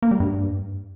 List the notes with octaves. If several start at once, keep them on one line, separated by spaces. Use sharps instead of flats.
A#3
G3
G2